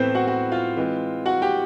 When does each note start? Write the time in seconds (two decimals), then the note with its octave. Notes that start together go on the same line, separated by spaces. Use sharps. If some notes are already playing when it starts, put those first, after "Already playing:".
Already playing: A2 E3 A3 B3 C4 B4 C5
0.15 F#4 F#5
0.28 F#4 F#5
0.52 F4 F5
0.77 E3 G#3 C4
1.26 F#4 F#5
1.42 G4 G5